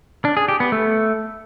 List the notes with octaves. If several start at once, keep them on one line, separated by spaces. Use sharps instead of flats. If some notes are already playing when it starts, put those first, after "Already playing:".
D4
G#4
G4
B3
A3